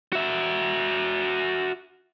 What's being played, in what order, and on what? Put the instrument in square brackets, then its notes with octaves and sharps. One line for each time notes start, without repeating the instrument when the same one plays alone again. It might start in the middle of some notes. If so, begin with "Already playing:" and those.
[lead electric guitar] F#4 E5